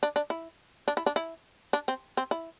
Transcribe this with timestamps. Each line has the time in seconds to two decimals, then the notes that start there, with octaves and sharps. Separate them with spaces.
0.03 D4
0.16 D4
0.30 E4
0.88 D4
0.97 E4
1.06 D4
1.16 E4
1.73 D4
1.88 C4
2.17 C4
2.31 E4